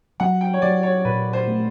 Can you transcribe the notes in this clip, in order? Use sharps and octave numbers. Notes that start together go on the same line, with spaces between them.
F#3 F#5
G5
C#5
F#3 D5
C#5
A#2 B4
C5
A3